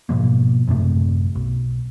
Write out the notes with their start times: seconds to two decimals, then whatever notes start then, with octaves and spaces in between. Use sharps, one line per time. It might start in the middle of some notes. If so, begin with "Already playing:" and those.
0.09 G#2 B2 F3 A#3
0.68 A1 F#2 C3 A3
1.35 B1